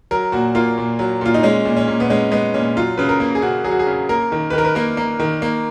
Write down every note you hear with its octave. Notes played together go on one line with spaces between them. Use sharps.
F#3 A#4
A#2 F#4
A#3 F4
A#2
F#3
A#2 F4
D#4
G#3 C#4
A#2
C#4
A#2
B3
G#3 C#4
G#3 B3
A#2 C#4
F#3 F4
C#3 B4
A#4
A#3
G#4
C#3 F#4
F#3 G#4
F#4
G#4
C#3
A#3 A#4
D#3
B4
D#3 A#4
B4
A#3 A#4
A#3
D#3
A#3